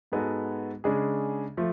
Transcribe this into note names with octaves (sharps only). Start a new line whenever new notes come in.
G#2 G#3 B3 F#4 A4
C#3 G#3 D4 G#4
F3 A3 F4